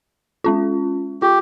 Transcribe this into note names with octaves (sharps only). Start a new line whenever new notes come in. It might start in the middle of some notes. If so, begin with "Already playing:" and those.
G#3 C#4 F4
F4 G4